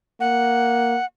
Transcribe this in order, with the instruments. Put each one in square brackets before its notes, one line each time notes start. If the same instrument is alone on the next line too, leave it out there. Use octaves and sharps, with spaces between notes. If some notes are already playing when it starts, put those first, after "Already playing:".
[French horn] A#3 [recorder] F#5